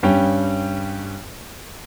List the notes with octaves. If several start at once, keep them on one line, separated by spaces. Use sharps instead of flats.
G2 G3 C#4 G5